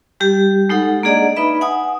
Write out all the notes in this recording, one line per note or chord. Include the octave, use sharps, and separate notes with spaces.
G3 G4
G#3 D#4 A4 F#5
A#3 D4 G#4 D5 D#5 F#5
D#4 B4 E5 B5
F#5 G#5 D#6